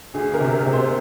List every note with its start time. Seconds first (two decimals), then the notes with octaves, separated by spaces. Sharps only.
0.14 D2 G#4
0.34 A#4
0.40 C3
0.53 A#4
0.66 C3
0.73 C5